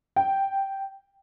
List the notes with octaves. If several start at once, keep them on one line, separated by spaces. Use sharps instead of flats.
G5